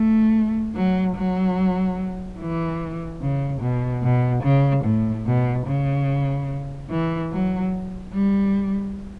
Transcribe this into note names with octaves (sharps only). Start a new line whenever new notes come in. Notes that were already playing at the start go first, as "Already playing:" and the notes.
Already playing: A3
F#3
F#3
E3
C#3
B2
B2
C#3
A2
B2
C#3
E3
F#3
G3